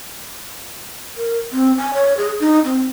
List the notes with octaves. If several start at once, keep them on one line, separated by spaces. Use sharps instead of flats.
A#4
C4
G#5
C#5
G#4
D#4
C4